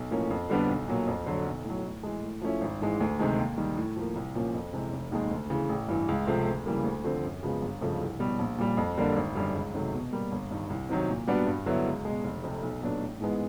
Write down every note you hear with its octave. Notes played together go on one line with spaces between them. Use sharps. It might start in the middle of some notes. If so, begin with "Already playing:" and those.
Already playing: B1
A2 F3 A#3 C#4
F2
D3 G3 B3 D4
B1
A#2 F#3 A#3
F2
D3 F#3
B1
A2 F#3
A2
E3 G#3
A2
F3 A3 C#4 E4
G#1
G#2 E3 G#3
D2
C3 D#3 G#3
D#2
D#3 G3
A2
F3 A#3
C2
A#2 F3 A#3 C#4
F2
C3 E3 G#3
F1
D#2 D#3 G#3
D2
C#3 E3
A1
G2 E3
C#2
C3 F3 A3 C4
D2
C#3 E3 G3 A#3
D2
D3 F3 A3 C4
F#2
C#3 F3 G#3 B3
G1
F2 C#3 F3 A3
C2
B2 G3
A#1
A#2 G3
F2
D3 G3 A#3 D4
G#1
F#2 D3 G3
C#2
C3 D#3 F#3 A3
B2
G3 A#3
G1
G2 D#3
C2
C3 D#3 F#3
A#2
G3 B3 D4 F#4
G2
D3 F#3 B3 E4
C#2
B2 G#3
F1
F2 C3
B1
A#2 F#3 B3 D4
A1
G#2 E3 G#3 B3